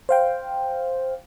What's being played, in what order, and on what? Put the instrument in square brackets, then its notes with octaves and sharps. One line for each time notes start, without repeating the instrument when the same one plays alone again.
[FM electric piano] C5 F5 G5